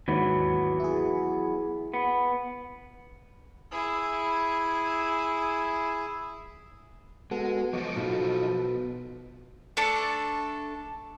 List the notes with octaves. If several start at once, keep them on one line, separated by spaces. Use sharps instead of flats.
D#2 G#2 E3 F#3 B3
E4 G#4
B3
E4 G#4
G#3 B3 F#4 A4
F3 F#3 C5 D#5 C#6 D6
B2 B3 D#4 F4 A4
A3 D4 A4 D6